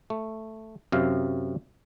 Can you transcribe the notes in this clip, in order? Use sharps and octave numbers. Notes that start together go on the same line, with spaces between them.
A3
F#2 C3 F5